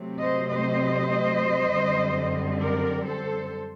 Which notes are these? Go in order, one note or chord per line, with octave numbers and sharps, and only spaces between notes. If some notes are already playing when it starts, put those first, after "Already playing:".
Already playing: C3 F#3 A3 C4
C5 D#5
C5 D#5
F#2 D3 G3 C4
A#4 D5
A4 C5